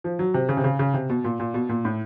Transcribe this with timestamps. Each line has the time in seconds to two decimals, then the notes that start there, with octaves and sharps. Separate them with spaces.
0.04 F3
0.19 F#3
0.34 C3
0.49 C#3
0.57 C3
0.64 C#3
0.79 C#3
0.94 C3
1.10 B2
1.24 A#2
1.40 A#2
1.54 B2
1.69 A#2
1.85 A2